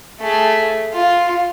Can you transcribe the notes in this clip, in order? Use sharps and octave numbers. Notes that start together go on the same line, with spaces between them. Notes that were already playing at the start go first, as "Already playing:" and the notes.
A3 G#4
F4